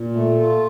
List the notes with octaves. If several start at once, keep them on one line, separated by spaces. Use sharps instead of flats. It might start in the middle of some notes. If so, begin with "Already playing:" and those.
Already playing: A#2
A3
F4